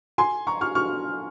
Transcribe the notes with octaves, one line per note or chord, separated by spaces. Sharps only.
G#5 C6
A#5 C#6
C#6 F6
C#6 F6